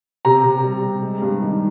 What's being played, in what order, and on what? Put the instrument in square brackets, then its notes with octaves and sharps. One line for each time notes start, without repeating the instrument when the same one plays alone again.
[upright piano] C3 A#5
C3
G3
C3
G#3
G2
D#3